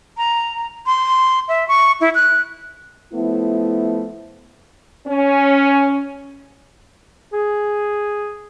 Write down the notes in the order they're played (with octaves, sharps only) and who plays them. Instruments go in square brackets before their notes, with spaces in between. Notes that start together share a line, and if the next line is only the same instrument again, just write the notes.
[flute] A#5
C6
E5
C#6
E4
F#6
[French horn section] F3 A3 B3 E4
C#4
[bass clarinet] G#4